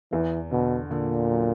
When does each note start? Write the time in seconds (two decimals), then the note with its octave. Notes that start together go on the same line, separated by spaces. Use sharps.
0.12 E2 E3
0.51 B2 D3
0.91 A#2 D3
1.31 F#3